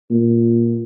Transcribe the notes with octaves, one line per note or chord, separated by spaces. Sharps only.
A#2